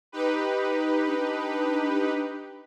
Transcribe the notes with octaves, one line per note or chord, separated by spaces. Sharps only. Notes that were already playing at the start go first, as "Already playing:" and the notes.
D#4 G4 B4
D4